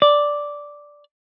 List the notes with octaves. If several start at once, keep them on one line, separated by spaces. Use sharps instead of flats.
D5